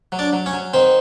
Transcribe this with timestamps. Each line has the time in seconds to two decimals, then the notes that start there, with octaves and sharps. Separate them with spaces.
0.12 F#3
0.19 D4 D5
0.33 F#3
0.46 C#4 C#5
0.53 F#3
0.74 D#3 C4 C5